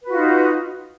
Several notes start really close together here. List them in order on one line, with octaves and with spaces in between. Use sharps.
B4 F#4 F4 D#4